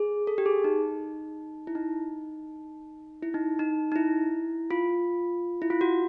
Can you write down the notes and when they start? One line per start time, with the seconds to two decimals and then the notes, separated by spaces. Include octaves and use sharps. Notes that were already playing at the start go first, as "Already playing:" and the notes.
Already playing: G#4
0.27 A4
0.38 G4
0.46 G#4
0.64 D#4
1.67 E4
1.75 D#4
3.23 E4
3.34 D#4
3.59 D#4
3.92 D#4
3.96 E4
4.71 F4
5.62 E4
5.70 F4
5.81 F#4